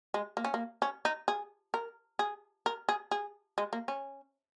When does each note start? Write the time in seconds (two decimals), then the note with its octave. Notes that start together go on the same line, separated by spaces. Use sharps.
0.14 G#3
0.37 A#3
0.45 C#4
0.54 A#3
0.82 C#4
1.05 D#4
1.28 G#4
1.74 A#4
2.19 G#4
2.66 A#4
2.89 G#4
3.11 G#4
3.58 G#3
3.73 A#3
3.88 C#4